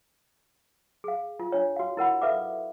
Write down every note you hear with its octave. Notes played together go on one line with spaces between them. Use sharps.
G#4 F5
F4
D4 F4 C#5
F#4 F5
E4 A#4 F#5 B5
A4 B4 E5 F5 D6